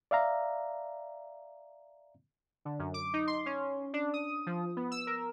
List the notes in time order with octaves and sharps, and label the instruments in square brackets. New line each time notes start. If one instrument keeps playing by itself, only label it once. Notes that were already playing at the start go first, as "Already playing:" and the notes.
[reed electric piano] D5 E5 F5 A#5
[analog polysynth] D3
F#2
D6
D#4
C6
C#4
D4
D#6
F3
B3
E6
A#4